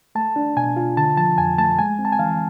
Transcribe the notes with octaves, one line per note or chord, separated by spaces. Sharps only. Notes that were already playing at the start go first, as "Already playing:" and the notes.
A3 A5
D4
B2 G#5
F4
D3 A5
F3 A5
F2 G#5
A3 A5
G#3 G#5
C4
A5
G#5
E3 F5